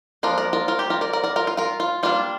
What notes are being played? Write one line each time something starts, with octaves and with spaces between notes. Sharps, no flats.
F3 A#3 D4 F4 A#4
A#4 D5
F4 A#4
F4 A#4
G4
F4 A#4
A#4 D5
A#4 D5
A#4 D5
F4 A#4
F4
F4 A#4
F4
G3 A#3 D4 F4